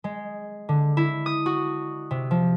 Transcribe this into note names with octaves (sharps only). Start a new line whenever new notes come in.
G#3
D3
E4
D#6
F#4
C3
F3